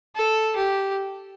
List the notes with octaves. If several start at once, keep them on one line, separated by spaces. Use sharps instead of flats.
A4
G4